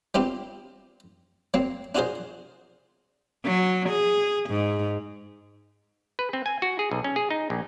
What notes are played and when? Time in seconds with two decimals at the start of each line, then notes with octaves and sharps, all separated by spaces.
0.14 G3 B3 C4 D4 F4 G4
1.54 F#3 A#3 C4
1.95 D4 F4 F#4 G#4 A#4 C5
3.45 F#3
3.90 G#4
4.50 G#2
6.19 B4
6.33 C4
6.46 G#5
6.62 F#4
6.79 G#4
6.91 B1
7.04 C#4
7.16 G#4
7.30 D#4
7.50 A#1